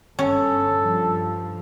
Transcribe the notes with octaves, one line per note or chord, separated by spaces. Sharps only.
G1 C#4 A4
G2 F3